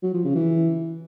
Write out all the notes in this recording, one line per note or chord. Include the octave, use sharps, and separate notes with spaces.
F#3
F3
C#3
E3